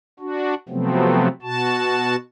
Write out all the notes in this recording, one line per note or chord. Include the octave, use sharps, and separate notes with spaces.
D4 F#4
C3 F3 F#3 A3 B3 C4
B2 F#4 A5